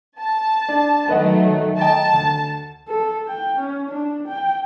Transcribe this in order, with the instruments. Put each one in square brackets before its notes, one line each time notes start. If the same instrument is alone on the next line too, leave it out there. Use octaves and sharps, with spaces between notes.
[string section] A5
[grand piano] D4
[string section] D#3 F#3 A3 [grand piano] B4 D#5 F#5
[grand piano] D#5 G5 A#5 [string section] A5
[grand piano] D2
[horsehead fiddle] A4
G5
C#4
D4
G5